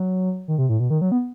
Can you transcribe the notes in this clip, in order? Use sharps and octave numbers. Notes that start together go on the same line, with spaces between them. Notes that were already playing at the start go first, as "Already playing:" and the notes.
Already playing: F#3
D#3
C3
A2
B2
D#3
F#3
B3